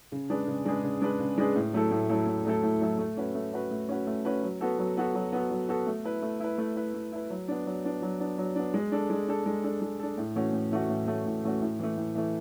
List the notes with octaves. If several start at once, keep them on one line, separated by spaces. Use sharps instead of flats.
C#3
G#3 D4 G#4 B4
C#3
G#3 D4 G#4 B4
C#3
G#3 D4 G#4 B4
C#3
G#3 D4 G#4 B4
A2
F#3 A3 E4 A4
A2
F#3 A3 E4 A4
A2
F#3 A3 E4 A4
A2
F#3 A3 E4 A4
A3
C#4 F#4 B4
A3
C#4 F#4 B4
A3
C#4 F#4 B4
A3
C#4 F#4 B4
F#3
B3 F#4 A4
F#3
B3 F#4 A4
F#3
B3 F#4 A4
F#3
B3 F#4 A4
A3
E4 B4
A3
E4 B4
A3
E4 B4
A3
E4 B4
F#3
B3 D4
F#3
B3 D4
F#3
B3 D4
F#3
B3 D4
G#3
D4 A4
G#3
D4 A4
G#3
D4 A4
G#3
D4 A4
A2
E3 A3 C#4 F#4
A2
E3 A3 C#4 F#4
A2
E3 A3 C#4 F#4
A2
E3 A3 C#4 F#4
A2
E3 A3
A2
E3 A3